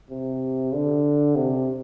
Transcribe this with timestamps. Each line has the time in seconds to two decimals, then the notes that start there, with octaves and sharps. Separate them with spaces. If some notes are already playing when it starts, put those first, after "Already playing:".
0.10 C3
0.73 D3
1.35 C3